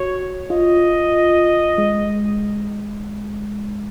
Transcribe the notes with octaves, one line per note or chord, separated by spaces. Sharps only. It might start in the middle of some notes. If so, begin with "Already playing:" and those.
Already playing: F#4 C#5
F4 D#5
G#3